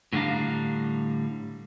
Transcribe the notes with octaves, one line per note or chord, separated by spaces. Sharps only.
A2 D3 G3 D4 F5 A#5